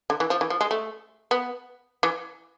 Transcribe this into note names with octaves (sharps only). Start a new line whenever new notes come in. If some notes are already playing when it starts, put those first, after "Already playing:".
D3
E3
F3
E3
F3
G#3
A3
B3
E3